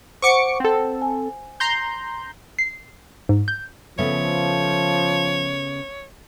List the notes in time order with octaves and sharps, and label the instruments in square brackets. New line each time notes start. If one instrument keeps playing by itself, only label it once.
[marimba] C5 F#5 [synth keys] C#6 D6 C#7
[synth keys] C4 A4
[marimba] G#5
[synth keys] A#5 C6 G6
[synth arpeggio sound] C7
G#2
G6
[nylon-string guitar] C#3 A3 B3 [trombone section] F3 [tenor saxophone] C#5